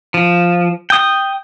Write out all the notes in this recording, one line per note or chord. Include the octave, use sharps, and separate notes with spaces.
F3
G5 D#6